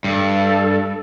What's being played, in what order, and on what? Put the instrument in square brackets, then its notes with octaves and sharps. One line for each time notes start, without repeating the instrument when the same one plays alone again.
[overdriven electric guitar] G2 [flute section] A4